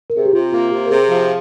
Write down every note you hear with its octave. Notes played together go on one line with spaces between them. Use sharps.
A#4
C3 G#4
G4
C3 F4
A#3 F4
C3 G4
A#4
C3 G#4
F3